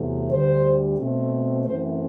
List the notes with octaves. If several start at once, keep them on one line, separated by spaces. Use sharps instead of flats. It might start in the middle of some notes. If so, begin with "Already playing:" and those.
Already playing: E2 C3 F#3 A3
D2 D3 G3 C5
B2 A3 C4
F#2 E3 A3 C4 C5